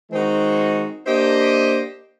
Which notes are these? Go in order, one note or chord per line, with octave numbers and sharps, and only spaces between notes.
D#3 G#3 C4 D#4 F#4
A#3 D4 G4 C5 D#5